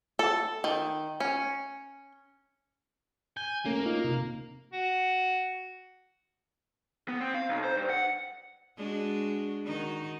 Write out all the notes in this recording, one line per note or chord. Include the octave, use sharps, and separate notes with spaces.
A4
D#3
C#4
G#5 G6
A3 A#3 C#4
D#4 F4 F6
C3
F#4
B3
C4
F5
B1
C5
G2
F#5
G#3 D4 F#4
D#3 D#4 F#4